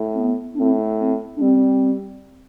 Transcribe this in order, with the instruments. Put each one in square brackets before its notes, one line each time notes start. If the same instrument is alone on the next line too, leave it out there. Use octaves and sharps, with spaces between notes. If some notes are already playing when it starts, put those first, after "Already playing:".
Already playing: [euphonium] A2
[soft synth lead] C4
B3
D4
[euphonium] A2 [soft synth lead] C4
[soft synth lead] C4
D4
[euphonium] G3 [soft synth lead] C4